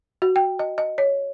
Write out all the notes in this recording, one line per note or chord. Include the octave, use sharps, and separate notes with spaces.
F#4
G5
D#5
D#5
C#5